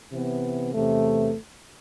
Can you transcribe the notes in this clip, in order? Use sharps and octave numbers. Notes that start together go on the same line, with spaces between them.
C3 E3 B3
E2 C3 E3 A3